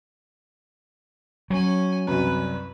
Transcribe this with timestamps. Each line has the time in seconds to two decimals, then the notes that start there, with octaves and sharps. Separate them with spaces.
1.50 F#3 C#4 G#5
2.07 C2 F#2 B4